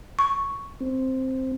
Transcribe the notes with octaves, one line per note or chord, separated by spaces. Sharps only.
C#6
C4